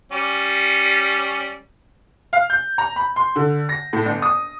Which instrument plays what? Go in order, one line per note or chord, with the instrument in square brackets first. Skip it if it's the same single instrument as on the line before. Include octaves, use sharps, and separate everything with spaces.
[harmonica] G3 C#4
[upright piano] F5
G6
A#5
B5
C6
D3
A#6
A2
G1
D#6